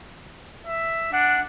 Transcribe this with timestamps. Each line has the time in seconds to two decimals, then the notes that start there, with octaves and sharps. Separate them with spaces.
0.67 E5
1.13 D4 F#5